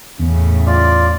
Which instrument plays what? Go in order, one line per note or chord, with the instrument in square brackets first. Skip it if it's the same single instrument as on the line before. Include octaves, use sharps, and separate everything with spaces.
[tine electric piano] E2 [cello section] A2 C#3
[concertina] F4 D5